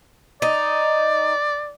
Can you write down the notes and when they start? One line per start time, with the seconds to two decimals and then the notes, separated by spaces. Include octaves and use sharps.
0.42 D#4 D5